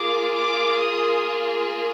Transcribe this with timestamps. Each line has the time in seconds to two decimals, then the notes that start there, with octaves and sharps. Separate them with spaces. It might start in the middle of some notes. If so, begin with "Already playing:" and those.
Already playing: A#3 F4 G#4 D6
0.32 D6
0.78 D#6